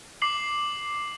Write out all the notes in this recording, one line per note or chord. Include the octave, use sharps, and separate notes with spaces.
D6 C7 F#7